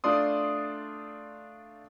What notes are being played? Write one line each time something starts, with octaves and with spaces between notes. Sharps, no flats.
A3 D4 F4 D5 C6 D#6